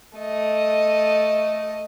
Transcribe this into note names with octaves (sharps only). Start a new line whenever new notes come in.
A3 D#5